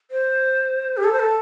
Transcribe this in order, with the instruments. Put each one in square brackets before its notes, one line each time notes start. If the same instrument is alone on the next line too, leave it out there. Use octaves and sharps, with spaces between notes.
[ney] C5
G4
A4
C5
A4